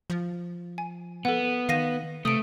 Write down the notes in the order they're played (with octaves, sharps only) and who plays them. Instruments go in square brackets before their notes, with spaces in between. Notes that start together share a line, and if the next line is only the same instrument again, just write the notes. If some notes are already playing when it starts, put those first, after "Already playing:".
[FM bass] F3
[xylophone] G#5
[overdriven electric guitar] B3 [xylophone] A4 F#5
[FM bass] D#3 [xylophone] F5 A#6 D#7
[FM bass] C3 [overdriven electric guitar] A3 [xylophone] D#6 D7